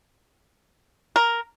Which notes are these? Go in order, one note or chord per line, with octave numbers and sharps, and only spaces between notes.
A#4